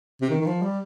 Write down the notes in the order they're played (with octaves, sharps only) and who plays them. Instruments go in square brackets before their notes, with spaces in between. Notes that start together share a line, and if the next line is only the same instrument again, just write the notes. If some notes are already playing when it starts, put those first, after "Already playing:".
[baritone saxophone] C3
D#3
D#3
F3
G3